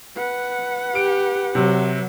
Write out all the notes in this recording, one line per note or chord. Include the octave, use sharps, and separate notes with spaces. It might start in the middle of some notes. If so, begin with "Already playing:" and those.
B4 F#5
G4 D7
C3 F#3